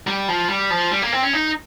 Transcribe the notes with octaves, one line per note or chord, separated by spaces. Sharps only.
G3
F3
G3
F3
G3
A#3
C4
C#4
D#4